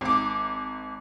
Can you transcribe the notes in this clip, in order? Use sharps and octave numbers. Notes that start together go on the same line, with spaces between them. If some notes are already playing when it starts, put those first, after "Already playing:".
G#1 D6